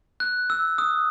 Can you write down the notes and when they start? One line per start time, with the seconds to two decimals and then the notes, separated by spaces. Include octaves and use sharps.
0.20 F#6
0.50 E6
0.78 D#6